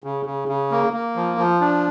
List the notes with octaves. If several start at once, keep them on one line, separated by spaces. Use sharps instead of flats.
C#3
C#3
C#3
A#3
A#3
F3
F3
D4